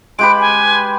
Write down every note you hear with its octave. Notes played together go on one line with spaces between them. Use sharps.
G#3 G4 B4 D7
G#5